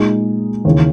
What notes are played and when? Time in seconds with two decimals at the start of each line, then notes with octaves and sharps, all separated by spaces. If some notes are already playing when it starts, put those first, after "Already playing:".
Already playing: A#2 G#3 D#4 G#4
0.65 D#2 C#3 E3